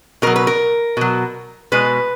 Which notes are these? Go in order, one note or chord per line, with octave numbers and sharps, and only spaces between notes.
B2 F#3 A#4
B4
A#4
B2 F#3
B2 G#3 B4